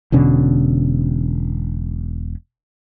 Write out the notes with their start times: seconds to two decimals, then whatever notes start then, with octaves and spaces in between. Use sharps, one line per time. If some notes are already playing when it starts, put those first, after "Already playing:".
0.12 E1 B2 D3 C#4